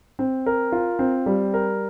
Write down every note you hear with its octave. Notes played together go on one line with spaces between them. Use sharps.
C4
A#4
F4
C4
G3
A#4